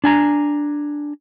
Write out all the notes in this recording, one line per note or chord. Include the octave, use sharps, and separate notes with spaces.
D4 G#5 A#5